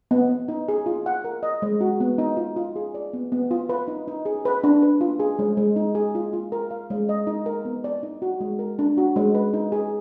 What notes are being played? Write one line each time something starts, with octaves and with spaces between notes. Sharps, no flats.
B3
B3
D#4
G#4
F4
F#5
A#4
D#5
G#3
F#4
B3
D#4
F4
F4
G#4
D5
B3
B3
F4
B4
D#4
D#4
G#4
B4
D4
B4
F4
G#4
G#3
G#3
D#4
G#4
F4
F4
A#4
F5
G#3
D#5
D#4
A#4
B3
D5
D#4
F#4
G#3
A#4
D4
F#4
G#3
B4
D#4
G#4